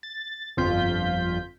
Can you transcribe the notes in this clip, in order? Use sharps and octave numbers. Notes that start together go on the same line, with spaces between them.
A6
G1 F2 F4 G6 B6